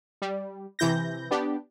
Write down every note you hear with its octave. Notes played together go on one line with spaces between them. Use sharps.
G3
C3 E3 E4 G6 A#6
B3 D4 G4